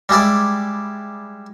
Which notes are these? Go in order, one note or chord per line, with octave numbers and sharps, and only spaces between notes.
G3 G#3 E4 D5